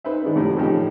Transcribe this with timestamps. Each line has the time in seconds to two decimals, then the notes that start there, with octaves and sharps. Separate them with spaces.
0.04 D#4 B4 C5 E5
0.22 D#3 G#3 D4 D#4 B4
0.35 C2 F#2 A2 F3 G3
0.57 A2 C#3 E3 F3 D#4 G4